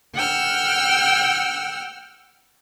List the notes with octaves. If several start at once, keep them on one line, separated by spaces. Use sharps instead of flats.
F#5 G5 E6 F6